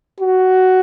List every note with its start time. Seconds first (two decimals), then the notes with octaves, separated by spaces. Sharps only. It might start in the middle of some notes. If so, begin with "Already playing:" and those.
0.20 F#4